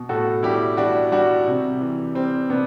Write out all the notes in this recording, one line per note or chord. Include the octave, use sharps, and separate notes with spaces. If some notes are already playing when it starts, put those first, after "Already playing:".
Already playing: B2
A2 F#4 A4
G3 E4 G4
G3 D4 F#4
G3 D4 F#4
C3
E3
G3 C4
C3 B3 D4